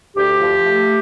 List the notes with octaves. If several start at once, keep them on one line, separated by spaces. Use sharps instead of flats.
D2 G4
F3
A3